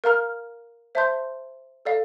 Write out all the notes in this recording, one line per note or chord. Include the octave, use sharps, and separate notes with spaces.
A#4 F5 A#5 F6
C5 E5 A5 C6 G6
A4 D5 F5